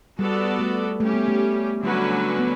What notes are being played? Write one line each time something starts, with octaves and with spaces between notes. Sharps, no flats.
G3 B3 F#4 A4 D5
A3
G3 A3 C#4 G4
B3
A3
D3 F#3 G3 C#4 F#4 B4
A3
B3